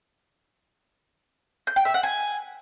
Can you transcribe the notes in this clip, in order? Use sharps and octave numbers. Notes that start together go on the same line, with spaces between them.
G6
G5
E5
F#5
G#5